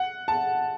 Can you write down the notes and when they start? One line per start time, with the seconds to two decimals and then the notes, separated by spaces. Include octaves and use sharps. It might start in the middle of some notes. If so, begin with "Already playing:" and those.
Already playing: F#5
0.28 A5